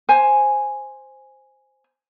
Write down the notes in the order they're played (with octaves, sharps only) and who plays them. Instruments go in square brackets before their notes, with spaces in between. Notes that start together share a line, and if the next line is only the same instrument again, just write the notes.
[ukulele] C5 G#5